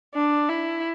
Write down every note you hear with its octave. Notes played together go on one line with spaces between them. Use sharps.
D4
E4